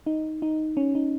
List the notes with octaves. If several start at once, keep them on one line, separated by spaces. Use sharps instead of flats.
D#4
D#4
C#4
D#4